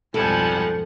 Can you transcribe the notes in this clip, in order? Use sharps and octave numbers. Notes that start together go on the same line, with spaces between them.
B1 F2 G#2 F3 G3 A4 F#5 G#5